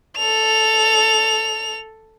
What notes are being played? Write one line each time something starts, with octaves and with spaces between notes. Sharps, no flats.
A4 F7